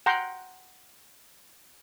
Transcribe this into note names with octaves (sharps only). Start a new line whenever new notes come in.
F#5 G5 A#5 C6